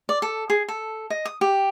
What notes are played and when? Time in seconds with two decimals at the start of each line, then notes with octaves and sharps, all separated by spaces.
0.09 D5
0.22 A4
0.50 G#4
0.68 A4
1.10 D#5
1.25 D#6
1.41 G4